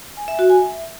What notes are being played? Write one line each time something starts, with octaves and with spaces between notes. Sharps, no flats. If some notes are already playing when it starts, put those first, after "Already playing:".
G#5
E5
F#4
G#5
E5